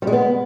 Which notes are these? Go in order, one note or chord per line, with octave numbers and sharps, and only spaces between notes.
G3
G#3
B3